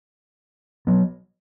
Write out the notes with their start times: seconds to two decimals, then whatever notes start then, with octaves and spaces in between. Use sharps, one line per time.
0.87 F#3 B3